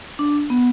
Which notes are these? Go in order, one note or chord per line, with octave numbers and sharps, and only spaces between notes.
D4
B3